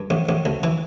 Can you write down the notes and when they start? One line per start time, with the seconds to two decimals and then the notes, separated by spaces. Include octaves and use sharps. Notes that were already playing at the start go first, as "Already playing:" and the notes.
Already playing: G2
0.10 A1
0.29 A1
0.45 D2
0.63 E3